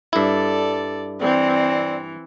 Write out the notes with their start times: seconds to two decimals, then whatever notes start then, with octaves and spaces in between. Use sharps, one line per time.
0.13 G2 E4 A4 D5
1.21 E3 C4 D5